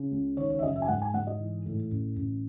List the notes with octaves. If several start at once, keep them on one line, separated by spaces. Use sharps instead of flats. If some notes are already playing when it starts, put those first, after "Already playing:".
Already playing: C#3
C#2
D#3 C#5
C#5
E5
F#1 D#5
E5
G#5
G#2 F#5
G#5
G#2 F#5
D#5
E3
A2
A1
A1